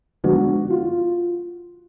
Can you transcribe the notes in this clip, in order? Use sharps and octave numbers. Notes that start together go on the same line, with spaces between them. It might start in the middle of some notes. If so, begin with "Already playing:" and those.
D3 F3 G#3 B3 D4 F#4
F#4
F4